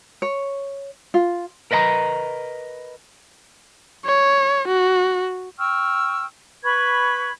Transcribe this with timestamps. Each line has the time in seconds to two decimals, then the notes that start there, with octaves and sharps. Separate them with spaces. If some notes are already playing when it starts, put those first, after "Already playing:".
0.22 C#5
1.14 F4
1.71 A#4 B4 D#5 F#5 A#5
4.05 C#5
4.68 F#4
5.58 G5 C#6 E6 F6
6.64 B4 B5 C#6 G#6